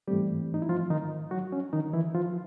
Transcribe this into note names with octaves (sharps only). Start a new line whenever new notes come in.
G#2 E3 G3 A3 C4 G4
D#4
E4
F3 F4
D#3 D#4
F#3 F#4
C#4
D#3 D#4
E3 E4
F3 F4